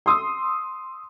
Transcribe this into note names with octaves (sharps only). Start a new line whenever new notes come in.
C6 D#6 E6